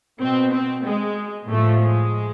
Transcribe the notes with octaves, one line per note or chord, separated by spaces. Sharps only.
B2 C4
C4
G#3
A2 F3 A3
G#3